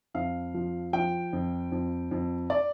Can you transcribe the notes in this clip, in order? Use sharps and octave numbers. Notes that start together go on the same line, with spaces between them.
F2 F5
F3
F3 G5
F2
F2
F2
D5